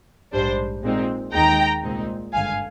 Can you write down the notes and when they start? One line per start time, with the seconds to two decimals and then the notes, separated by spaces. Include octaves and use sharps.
0.32 A#1 G#2 G3 D4 C5
0.82 A#2 G#3 C4 D#4
1.33 D#2 D#3 G#3 D#4 G5 A#5
1.83 C2 A#2 G#3 C4 D#4
2.33 G#1 G2 D3 F5 G#5